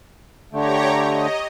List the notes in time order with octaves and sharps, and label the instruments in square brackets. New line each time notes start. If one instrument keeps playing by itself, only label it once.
[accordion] D3 A3 [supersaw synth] G4 C#5 A#5
[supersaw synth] D#5